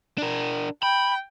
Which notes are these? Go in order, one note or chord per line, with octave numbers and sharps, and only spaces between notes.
D4 A#4
G5 B5